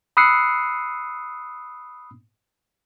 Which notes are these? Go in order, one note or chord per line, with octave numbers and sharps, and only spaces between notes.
B5 D#6 E6 F#6 C7 C#7